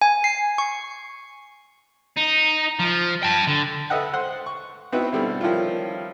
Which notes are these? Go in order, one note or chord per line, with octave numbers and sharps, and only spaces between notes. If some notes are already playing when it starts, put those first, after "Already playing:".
G#5
C7
C#6
D#4
F3
G5 A5
D3
A4 B4 D#5 E5 F#5 G5
C5 F#5 C6
C#6
B3 C4 D#4 E4 F#4 B4
B2 D3 G3 C4 E4
D#3 F3 G3 C#4 E4 F4